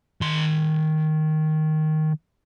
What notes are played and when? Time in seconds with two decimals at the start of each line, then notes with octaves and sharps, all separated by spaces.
0.21 D#3 C6